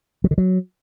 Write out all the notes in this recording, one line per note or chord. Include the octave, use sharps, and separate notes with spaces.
F#3
D3
F#3